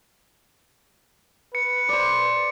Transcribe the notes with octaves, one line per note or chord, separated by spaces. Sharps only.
B4 C#7
C5 D5